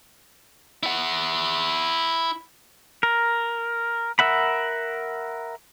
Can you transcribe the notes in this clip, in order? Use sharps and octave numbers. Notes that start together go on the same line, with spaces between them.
E4 F#5
A#4
A#4 E5 F#5 B5